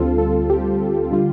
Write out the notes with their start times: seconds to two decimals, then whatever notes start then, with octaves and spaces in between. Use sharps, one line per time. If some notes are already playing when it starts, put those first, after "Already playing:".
Already playing: D2 D3 G3 C4 F4 A4
0.18 A4
0.50 G4
1.11 D3 G3 F4